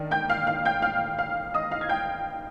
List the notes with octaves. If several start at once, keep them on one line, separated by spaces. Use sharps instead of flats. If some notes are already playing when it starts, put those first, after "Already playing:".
Already playing: D#3 D4
G5 G6
F5 F6
F5 F6
G5 G6
F5 F6
F5 F6
D#5 D#6
F5 F6
G#6
G5 G6